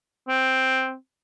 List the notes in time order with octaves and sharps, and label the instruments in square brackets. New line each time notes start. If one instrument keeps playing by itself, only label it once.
[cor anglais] C4